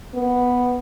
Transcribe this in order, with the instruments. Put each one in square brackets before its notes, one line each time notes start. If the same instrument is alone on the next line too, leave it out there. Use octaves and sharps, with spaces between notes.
[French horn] B3